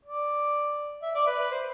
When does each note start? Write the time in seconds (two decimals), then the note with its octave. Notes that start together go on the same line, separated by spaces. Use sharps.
0.05 D5
1.02 E5
1.15 D5
1.27 B4
1.39 B4
1.51 C5